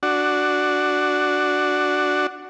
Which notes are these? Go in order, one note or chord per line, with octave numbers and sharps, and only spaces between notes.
D4 F#4